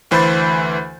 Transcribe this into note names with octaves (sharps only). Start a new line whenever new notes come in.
D2 E3 C5 B5 G6 A6